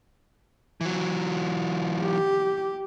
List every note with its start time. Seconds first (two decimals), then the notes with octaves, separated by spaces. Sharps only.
0.81 E3 F#3
2.03 G4